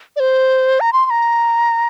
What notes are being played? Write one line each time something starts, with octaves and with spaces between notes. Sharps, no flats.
D5
C5
A#5
C6
C6
A#5